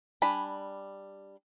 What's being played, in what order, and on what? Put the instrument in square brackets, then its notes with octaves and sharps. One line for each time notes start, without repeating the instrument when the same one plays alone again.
[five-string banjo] G3 D4 G#5 B5